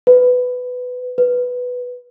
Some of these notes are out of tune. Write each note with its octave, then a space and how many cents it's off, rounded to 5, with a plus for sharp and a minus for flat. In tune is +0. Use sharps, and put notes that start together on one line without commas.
B4 +10
B4 +0